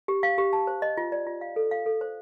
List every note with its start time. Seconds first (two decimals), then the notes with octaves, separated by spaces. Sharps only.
0.08 G4
0.23 F5
0.38 G4
0.53 A5
0.67 C5
0.82 D#5
0.97 F4
1.12 D5
1.27 F4
1.41 F5
1.56 A4
1.71 F5
1.86 A4
2.01 C5